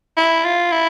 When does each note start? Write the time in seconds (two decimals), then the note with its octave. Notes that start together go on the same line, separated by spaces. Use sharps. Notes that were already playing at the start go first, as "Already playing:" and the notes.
0.17 E4
0.45 F4
0.72 E4